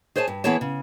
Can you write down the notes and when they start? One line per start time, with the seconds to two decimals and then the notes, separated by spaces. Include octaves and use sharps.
0.16 G#4 C5 C#5 G#5 A5
0.28 G2
0.44 E3 B3 E4 G#4 C#5 A5
0.61 C#3